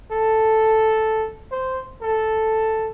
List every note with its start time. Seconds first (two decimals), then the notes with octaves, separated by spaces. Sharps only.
0.12 A4
1.51 C5
2.02 A4